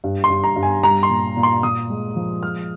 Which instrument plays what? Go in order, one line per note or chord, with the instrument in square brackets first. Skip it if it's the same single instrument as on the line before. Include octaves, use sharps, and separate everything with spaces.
[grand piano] G2
C6
G2
A#5
G2
G#5
G3 A#5
C6
A#2
A#2
C6
A#2 D#6
G#3
F3
G#3 F6